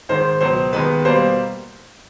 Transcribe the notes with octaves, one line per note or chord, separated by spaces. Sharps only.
G#2 D#3 G#3 C5
C#2 B2 F#3 C5
D#2 D#3 G#3 B3 B4
B2 G3 A#3 C5